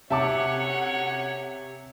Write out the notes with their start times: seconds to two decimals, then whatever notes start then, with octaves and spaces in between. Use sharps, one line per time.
0.10 D2 C3 C#4 C#5 E5 F#5 A5 D6